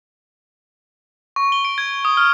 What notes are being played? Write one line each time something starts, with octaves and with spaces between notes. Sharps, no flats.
C#6
G7
D7
G#6
D#6
F6